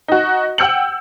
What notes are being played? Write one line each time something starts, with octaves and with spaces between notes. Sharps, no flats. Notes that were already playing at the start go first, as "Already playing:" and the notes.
D#4 F#4
F#5 G5 E6 G6 C#7 F#7